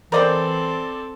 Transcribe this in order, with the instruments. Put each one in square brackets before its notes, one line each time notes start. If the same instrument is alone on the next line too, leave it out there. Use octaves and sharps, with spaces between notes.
[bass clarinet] E3 [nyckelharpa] C4 A4 [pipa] A#4 D#5 G5 [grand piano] C5 D5